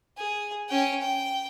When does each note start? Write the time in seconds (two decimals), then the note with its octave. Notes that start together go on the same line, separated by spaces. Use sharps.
0.18 G#4
0.69 C#4 G5
1.01 G5